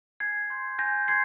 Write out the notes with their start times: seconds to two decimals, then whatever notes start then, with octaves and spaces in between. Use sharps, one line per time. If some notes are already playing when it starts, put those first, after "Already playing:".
0.20 G#5 G#6 C7
0.50 C6 G6
0.79 G#5 G6 A#6
1.08 C6 G6 G#6 C7